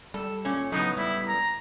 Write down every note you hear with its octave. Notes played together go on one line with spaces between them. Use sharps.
G3 A4
A#2 C#4
A2 C#3 F#3 B3 D#4
G3 E4
A#5